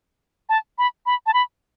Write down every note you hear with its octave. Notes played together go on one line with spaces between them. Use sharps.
A5
B5
B5
A5
B5